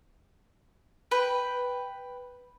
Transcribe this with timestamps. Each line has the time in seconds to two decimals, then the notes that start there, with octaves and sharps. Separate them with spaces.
1.11 B4 G5